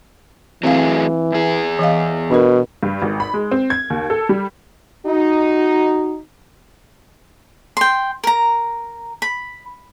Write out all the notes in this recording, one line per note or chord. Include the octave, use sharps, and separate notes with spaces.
E3 F#3 A3 C4 G#4 F5
E2 G#4
E3 D#5 F5
B2 D4 A#4
G2
G#1
B5
G#3
C4
G#6
D#2
A4
G3
D#4 F#4
G5 C6
A#4 A#5
B5